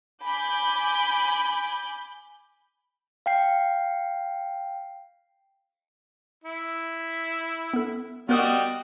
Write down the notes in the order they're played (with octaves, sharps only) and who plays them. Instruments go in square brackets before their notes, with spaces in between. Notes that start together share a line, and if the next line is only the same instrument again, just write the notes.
[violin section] G#5 B5 D6 G6
[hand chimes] F5 G5 C7
[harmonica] E4
[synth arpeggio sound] B3 A4
[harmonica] G3 F#4 D#5 [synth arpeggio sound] B3 A#4 D#6